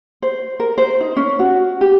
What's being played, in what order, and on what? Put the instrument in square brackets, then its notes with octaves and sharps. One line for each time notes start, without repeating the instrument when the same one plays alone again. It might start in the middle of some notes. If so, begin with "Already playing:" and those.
[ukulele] C5
A#4
C5
D#4
C#4
F#4
G4